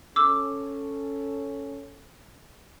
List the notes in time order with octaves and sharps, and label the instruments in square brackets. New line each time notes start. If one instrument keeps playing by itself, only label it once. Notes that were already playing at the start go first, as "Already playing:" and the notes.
[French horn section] C#4 A4 [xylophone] D6 E6